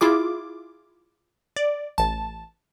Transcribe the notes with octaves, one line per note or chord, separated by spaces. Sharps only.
E4 F4 G#4 D6
D5
A1 A5